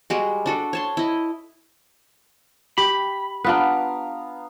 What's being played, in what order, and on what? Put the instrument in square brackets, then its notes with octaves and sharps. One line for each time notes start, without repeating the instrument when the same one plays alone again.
[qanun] G3 G#3 F#4
D4 F#4 A4
C#5 A5 C6
E4 D#5
[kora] G4 [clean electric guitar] B5
[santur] B3 F5 A#5 [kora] D4 F4 B4